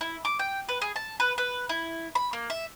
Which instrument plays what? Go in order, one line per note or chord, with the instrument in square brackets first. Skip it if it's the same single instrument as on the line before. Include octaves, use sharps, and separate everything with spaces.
[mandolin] E4
D6
G5
B4
G#4
A5
B4
B4
E4
B5
A#3
E5